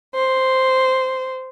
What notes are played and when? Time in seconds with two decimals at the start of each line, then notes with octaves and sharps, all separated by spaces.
0.14 C5